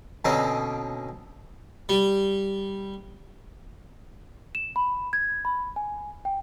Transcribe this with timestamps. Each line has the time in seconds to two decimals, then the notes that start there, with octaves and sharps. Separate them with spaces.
0.25 B2 D3 C4 C#4 D#4
1.89 G3
4.55 E7
4.76 B5
5.13 G#6
5.45 B5
5.76 G#5
6.25 G5